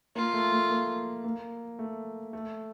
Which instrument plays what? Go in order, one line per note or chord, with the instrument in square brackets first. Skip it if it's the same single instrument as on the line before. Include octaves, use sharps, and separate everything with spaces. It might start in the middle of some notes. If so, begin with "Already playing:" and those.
[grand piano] A#3 [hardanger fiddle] F4
[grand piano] A3
A3
A#3
A#3
A3
A3